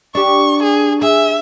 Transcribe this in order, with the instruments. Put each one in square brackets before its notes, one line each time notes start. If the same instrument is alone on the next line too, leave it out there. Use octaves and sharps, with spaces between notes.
[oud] D4 G4 [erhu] C#6
[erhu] G#4
[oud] G#4 [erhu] E5